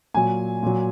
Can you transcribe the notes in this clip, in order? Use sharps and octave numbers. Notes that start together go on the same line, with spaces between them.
A#2 F#3 G#5
A#2 F#3